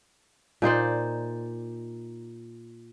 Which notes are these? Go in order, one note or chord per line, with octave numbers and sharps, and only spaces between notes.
A#2 D#4 C5 D5